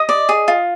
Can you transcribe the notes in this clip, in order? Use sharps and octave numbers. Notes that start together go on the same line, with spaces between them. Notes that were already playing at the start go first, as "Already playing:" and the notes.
Already playing: D#5 D#6
D5
G#4
F4